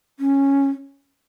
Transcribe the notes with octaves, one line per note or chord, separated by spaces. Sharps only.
C#4